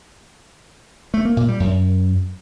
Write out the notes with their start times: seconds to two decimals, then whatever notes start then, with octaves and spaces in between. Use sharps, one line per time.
1.14 A3
1.25 A#3
1.37 A#2
1.48 G3
1.60 F#2